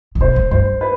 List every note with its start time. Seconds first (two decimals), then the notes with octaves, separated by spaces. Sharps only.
0.15 C3
0.20 B2 C5
0.36 A2
0.51 G2 C5
0.81 B4